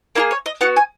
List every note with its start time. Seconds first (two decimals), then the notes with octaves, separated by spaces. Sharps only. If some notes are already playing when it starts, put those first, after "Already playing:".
0.15 A#3 E4 G#4 A#4
0.31 C#5
0.46 D#5
0.61 B3 F#4 F#5
0.76 G#5